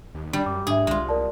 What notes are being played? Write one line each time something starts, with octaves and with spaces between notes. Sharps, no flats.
D#2
G3 D4
F#2 D6
G#2 D4 G#4 E5
C2 G#3 F4
A#4 D5 A5